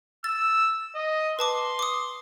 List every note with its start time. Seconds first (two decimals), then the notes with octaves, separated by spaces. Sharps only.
0.24 E6 A6
0.95 D#5
1.39 B4 A5 C6 D6
1.79 D6 D#6